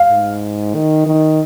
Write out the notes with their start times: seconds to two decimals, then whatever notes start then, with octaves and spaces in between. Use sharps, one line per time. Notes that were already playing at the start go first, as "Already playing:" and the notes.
Already playing: F5
0.09 G#2
0.74 D#3
1.06 D#3